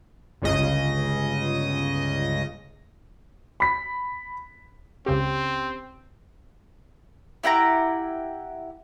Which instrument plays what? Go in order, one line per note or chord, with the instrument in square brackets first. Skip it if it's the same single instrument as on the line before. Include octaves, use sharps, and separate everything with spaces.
[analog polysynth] G1 C#2 C#3 D#5
[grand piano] B5 B6
[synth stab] C#2 C#3 G4 [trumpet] C4
[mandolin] E4 G4 F#5 A#5